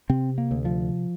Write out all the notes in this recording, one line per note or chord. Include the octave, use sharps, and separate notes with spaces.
C3 C4
A#3
D2
F3